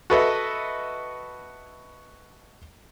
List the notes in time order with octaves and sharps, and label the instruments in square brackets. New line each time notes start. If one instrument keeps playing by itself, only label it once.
[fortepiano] F#4 A4 B4 D#5 E5